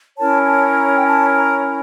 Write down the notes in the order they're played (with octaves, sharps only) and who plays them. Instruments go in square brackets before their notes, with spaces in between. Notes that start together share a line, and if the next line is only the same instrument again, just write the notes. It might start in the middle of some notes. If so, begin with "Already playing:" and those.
[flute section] C#4 E4 A#4 C#5 A5
A5
A#5
G5
A5
A#5